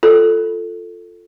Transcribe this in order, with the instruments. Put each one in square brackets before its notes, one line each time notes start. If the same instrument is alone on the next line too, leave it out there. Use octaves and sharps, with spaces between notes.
[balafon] F4 A4